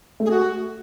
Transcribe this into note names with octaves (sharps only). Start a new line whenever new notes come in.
A3
G#4
F#4